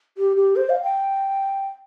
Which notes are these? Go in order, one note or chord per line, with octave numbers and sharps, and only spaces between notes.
G4
G4
C5
F5
G5